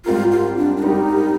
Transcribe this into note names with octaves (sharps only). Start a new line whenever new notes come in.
G#2 G3 C4 F4 G4 A#4
F4
D4
D4
G3 C4 D#4 G4 A#4